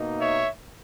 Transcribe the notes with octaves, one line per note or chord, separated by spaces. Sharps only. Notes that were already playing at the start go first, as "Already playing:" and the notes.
Already playing: B2 A#3 D#4
C#5 E5